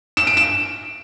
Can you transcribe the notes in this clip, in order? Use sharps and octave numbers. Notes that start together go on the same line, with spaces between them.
E7
D7
E7